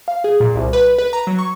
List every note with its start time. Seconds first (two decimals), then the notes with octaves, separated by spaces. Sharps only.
0.08 F5
0.24 G#4
0.40 A#2
0.55 C2
0.73 B4
0.99 B4
1.13 A#5
1.27 F#3
1.39 C#6